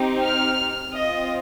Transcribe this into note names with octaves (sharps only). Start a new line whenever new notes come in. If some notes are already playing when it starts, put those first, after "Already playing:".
Already playing: C4 D#4 G4
F6
C4 F4 D#5